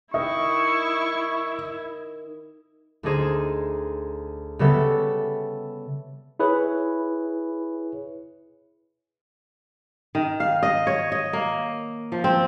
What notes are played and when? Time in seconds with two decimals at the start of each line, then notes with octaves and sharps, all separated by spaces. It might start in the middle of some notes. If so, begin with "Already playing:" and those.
0.14 D#3 E4 D#5 E5 C#6
3.03 D2 D4 D#4 G#4 C5 E7
4.59 C#3 G3 B3 A4 E5
6.40 E4 G#4 B4 C#5
10.15 D#3
10.40 F5
10.63 D#5
10.87 C#5
11.12 D#5
11.33 A#3
12.12 F3
12.24 C4